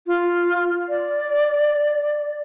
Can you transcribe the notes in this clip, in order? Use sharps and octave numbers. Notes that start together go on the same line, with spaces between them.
F4
D5